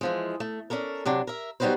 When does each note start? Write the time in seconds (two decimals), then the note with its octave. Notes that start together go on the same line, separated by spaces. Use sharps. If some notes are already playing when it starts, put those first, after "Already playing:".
0.01 E3 F3 G#3
0.40 A3
0.70 C#4 D4 A4 A#4
1.05 C3 F#3 D4
1.27 A#4 E5
1.60 F#3 G3 B3 D#4 B4 C5